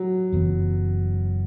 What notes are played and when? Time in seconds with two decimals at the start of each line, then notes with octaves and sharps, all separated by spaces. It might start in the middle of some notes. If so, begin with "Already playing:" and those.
Already playing: F#3
0.32 F#1 F#2 E3 B3